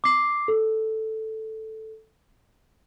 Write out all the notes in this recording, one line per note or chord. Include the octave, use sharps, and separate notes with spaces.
D6 C7
A4